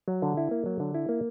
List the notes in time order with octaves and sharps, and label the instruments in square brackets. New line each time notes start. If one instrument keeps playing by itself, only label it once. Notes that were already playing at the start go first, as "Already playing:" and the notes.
[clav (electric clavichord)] F#3
D3
E4
A#3
F#3
D3
E4
A#3